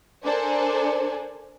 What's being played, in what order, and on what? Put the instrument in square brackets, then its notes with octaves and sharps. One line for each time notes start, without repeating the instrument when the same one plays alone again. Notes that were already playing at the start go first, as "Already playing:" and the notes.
[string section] D4 A4 A#4 C5 D5 G#5